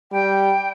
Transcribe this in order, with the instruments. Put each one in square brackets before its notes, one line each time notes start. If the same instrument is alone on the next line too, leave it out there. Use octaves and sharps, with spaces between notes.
[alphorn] G3 [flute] G5